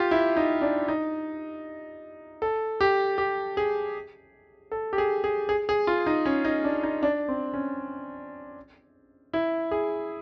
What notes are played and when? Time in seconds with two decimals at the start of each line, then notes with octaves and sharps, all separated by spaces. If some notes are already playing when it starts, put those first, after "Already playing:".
Already playing: F4 G4
0.11 E4
0.36 D#4
0.62 D4
0.88 D#4
2.42 A4
2.81 G4
3.18 G4
3.57 G#4
4.71 A4
4.93 G4
4.98 G#4
5.24 G#4
5.49 G#4
5.69 G#4
5.87 F4
6.06 D#4
6.25 C#4
6.45 D#4
6.64 D4
6.83 D#4
7.03 D4
7.28 C4
7.54 C#4
9.33 E4
9.71 G#4